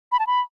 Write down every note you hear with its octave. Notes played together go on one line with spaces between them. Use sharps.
B5
A5
B5